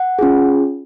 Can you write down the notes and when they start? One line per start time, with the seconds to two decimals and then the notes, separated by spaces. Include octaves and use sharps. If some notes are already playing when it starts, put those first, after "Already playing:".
Already playing: F#5
0.19 C#4 F4 G#4